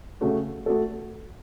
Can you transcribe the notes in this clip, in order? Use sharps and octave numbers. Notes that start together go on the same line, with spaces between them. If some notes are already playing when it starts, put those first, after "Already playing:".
C#3 A3 F#4
A3 F#4 A4